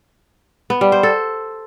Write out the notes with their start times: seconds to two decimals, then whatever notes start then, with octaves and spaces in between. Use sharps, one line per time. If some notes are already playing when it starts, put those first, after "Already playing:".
0.70 B3
0.81 G3
0.92 C5
1.03 A4